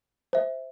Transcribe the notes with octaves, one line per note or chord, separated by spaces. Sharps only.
C5 E5